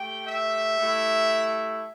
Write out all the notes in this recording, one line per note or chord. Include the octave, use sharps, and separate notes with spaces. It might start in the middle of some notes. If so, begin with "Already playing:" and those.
Already playing: A3 G4 G5
E5
A3 E4 G4